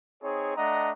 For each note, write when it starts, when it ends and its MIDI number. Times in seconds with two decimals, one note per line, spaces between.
0.23 0.56 60
0.23 0.56 63
0.23 0.56 68
0.23 0.56 73
0.57 0.92 57
0.57 0.92 62
0.57 0.92 75
0.57 0.92 78
0.57 0.92 82